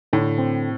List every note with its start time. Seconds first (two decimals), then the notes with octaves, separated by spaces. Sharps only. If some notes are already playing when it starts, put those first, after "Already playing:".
0.13 A2 D3
0.38 C4